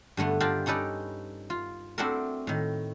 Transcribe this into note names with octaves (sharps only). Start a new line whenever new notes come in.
G2 D3 A3 B3
D4 F4 G4 A#4 D5 E5
C#4 D#4 A4 B4 D5
F4
A3 C4 D4 E4 F#4 A#4
A2 D#3